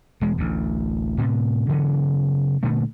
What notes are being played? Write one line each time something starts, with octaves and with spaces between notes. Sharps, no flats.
E1 G#3
A1 D2
A2 C3
C#3 E3 F#3 B3
A#2 D3 A3